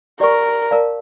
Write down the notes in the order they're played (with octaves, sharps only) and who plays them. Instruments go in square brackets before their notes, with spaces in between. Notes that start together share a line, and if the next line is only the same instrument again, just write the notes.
[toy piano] G4 D5 G5 C#6 [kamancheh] A#4
[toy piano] A#4 D5 F5 A5